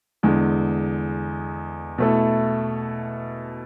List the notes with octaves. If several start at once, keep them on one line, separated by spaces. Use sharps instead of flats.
E2 D3 G#3
B2 A3 E4 A4